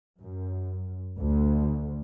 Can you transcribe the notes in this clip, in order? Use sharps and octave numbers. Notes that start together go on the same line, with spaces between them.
F#2
D2